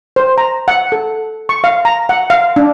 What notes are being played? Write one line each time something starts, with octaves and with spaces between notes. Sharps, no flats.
C5
A#5
F#5
A4
C#6
F5
A#5
F#5
F5
D4